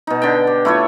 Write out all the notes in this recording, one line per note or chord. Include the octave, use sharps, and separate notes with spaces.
B2 D#4
D3 G5
G4
A3 E4 F4 C#5